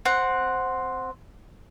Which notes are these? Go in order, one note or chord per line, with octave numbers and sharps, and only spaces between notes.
C4 F#5